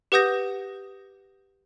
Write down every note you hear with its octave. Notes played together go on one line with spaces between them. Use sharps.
G4 B4 F#5 D#6 G6 A#6